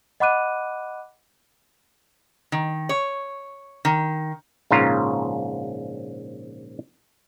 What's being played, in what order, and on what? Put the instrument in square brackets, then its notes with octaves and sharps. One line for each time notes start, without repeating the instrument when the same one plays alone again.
[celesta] D#5 F#5 B5 D6 F#6 D#7
[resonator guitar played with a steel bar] D#3
C#5
D#3
[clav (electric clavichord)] A#1 G#2 C#3 F4 A#5